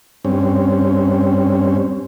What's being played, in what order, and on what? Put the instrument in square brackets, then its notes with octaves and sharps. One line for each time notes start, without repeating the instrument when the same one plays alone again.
[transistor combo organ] G2 C4 C#4